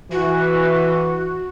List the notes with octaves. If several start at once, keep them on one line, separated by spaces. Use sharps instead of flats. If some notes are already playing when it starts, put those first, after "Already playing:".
E3 F#4